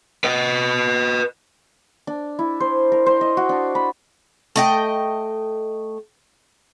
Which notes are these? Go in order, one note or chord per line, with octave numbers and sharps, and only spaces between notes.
B4 D#5
D4
E4
C5
A#4
C5
D#5
F#4
D4
B5
A3 D#5 G5